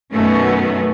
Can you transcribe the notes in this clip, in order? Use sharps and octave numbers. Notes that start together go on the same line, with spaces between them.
F#2 B2 D#3 A3 B3 C#4